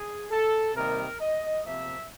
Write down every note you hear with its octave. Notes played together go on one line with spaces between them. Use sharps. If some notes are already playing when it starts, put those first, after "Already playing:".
Already playing: G#4
A4
C3 D#3 G3 A#3 A#4
D#5
C3 F3 A#3 E5